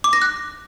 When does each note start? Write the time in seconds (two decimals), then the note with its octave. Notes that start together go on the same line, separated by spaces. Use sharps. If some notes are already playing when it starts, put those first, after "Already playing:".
0.04 D6
0.13 A#6
0.22 F#6